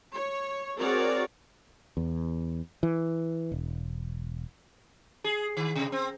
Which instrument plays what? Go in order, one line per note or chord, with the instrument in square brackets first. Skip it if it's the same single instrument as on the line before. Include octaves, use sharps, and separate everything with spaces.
[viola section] C#5
C4 F#4 G#4 A#4 C#5 D5
[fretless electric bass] E2
E3
E1
[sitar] G#4
D#3
C3
C4